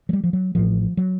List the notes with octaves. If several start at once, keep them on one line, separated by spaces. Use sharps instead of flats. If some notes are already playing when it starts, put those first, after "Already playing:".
F#3
G3
F3
F#3
A1 A2 F3
F#3